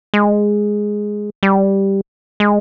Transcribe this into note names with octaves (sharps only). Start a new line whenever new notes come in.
G#3
G3
G#3